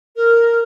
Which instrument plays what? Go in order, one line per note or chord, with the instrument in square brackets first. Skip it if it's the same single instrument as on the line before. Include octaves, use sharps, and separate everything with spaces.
[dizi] A#4